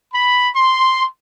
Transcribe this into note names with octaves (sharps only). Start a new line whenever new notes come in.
B5
C6